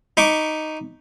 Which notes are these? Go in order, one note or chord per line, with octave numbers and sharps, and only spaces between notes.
D#4 B5 C#6 D6